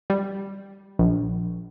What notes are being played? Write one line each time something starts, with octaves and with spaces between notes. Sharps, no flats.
G3
A#1